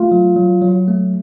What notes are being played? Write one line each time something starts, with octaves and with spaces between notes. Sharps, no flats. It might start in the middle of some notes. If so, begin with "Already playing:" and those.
Already playing: A3 F4
F#3
F#3
F#3
A3